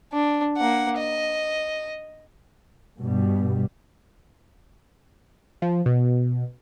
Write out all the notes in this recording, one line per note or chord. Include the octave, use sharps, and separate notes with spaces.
D4
A#3 F#5
D#5
G2 B2 G3
F3
B2